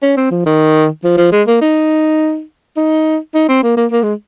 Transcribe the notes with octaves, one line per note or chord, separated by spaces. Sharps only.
C#4
C4
F3
D#3
F3
F3
G#3
A#3
D#4
D#4
D#4
C4
A#3
A#3
A#3
G#3